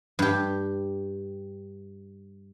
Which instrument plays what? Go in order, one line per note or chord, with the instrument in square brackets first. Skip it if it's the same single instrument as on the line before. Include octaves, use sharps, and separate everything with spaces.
[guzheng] G2 G4